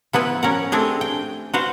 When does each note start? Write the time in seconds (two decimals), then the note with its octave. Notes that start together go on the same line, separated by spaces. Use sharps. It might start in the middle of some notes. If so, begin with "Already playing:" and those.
0.13 F3 B3 E4 B4
0.43 C#4 A#4 F#5
0.72 A3 C4 D4 G4 G#4 G5
1.01 G5
1.53 F#4 B4 C5 F5